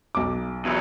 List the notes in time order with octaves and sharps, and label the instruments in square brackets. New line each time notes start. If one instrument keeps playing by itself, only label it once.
[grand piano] B1 D6
[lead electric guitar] E2 F#3